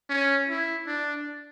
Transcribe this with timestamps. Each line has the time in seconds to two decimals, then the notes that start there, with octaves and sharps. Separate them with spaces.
0.09 C#4
0.49 E4
0.87 D4